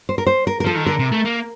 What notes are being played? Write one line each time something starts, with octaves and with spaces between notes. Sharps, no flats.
C5
A#4
C5
A#4
A#4
F3 A4
D#3
D3 A#4
C3
A3
A#3